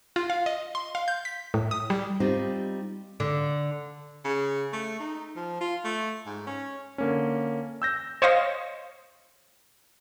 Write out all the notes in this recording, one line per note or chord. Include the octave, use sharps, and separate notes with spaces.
F4
F5
D#5
C6
F5
G6
B6
A2
D#6
G3
G3 C4 D#4 F4 G4
D3
C#3
A3
D#4
F3
F4
A3
G#2
C#4
D3 A#3 C#4
E6 G6 A#6
C5 C#5 D#5 F5 A#6